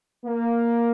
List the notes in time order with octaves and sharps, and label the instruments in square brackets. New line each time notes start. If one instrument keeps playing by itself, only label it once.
[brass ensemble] A#3